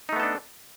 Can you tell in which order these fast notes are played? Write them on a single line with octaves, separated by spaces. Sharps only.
D#4 A3 B3 A4 D4